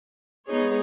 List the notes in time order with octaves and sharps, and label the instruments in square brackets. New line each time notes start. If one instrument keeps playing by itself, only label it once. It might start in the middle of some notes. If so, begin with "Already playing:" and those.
[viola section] G#3 B3 D#4 G#4 C#5